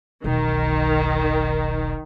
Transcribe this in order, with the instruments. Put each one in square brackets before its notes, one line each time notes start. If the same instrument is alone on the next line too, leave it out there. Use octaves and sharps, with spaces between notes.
[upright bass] E1 B1 [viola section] D#3